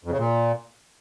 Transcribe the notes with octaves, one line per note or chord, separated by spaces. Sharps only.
F2
C#3
A#2